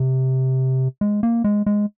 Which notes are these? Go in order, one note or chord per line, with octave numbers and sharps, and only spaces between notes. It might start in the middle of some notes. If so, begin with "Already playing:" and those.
Already playing: C3
G#3
A#3
G#3
G#3